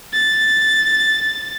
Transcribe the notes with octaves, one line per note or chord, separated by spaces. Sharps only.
A6